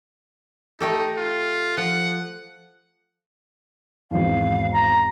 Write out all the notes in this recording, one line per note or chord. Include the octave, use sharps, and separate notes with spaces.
A3 D#4 G4 A4
F4
F3 F#5
G#1 E2 F5
A#5